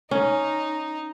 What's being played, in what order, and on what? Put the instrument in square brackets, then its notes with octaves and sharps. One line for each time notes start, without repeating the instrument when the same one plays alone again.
[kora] C#4 [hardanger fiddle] D#4